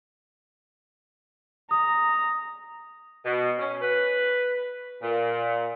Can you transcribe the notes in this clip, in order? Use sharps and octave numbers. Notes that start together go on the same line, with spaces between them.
A#5 D#6
B2
C#4
B4
A#2